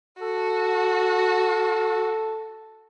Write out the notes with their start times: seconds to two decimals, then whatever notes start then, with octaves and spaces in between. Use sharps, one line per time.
0.21 F#4 A4